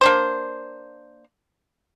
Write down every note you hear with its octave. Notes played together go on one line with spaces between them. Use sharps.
A#3 D4 C5